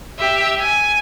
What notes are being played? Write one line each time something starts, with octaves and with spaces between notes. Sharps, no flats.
G4 E5
G#5